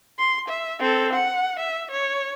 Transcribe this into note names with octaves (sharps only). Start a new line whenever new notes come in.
C6
E5
C4 A4
F#5
E5
C#5